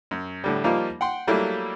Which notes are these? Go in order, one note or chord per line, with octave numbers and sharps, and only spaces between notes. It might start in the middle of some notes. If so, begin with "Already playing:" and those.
F#2
A2 D3 G3
F3 G3 A#3 D#4 F4
F#5 G5 C6
F#3 G3 A3 A#3 E4